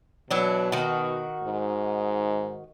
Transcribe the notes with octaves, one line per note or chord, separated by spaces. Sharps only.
B2 E3 F#3 D4
D#3 F#4
G#2